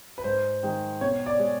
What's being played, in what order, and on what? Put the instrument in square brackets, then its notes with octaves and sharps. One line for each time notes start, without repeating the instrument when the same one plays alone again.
[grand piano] B4
G#2 C5
D#3 G#3
B2 C#5
D5
G#3